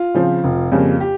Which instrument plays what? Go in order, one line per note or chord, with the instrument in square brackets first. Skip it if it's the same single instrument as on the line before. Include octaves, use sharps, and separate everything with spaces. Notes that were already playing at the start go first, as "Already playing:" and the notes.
Already playing: [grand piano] F4
[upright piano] C#3 F3 C4
F1
F2 C#3 G3 A#3
[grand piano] G4